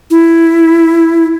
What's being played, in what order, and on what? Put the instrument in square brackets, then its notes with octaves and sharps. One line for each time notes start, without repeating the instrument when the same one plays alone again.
[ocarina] E4